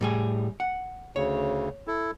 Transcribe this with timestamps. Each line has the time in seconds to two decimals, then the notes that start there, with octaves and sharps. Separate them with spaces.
0.01 A2 G3 G#4
0.60 F#5
1.16 D2 C#3 C#5
1.87 E4 A4